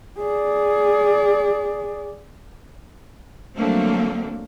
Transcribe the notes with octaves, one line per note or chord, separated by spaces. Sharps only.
G#4 D5
D3 F#3 G3 A3 A#3 C4